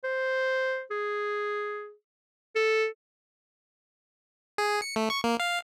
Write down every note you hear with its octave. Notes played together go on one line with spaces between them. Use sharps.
C5
G#4
A4
G#4
C#7
A3
C#6
A#3
F5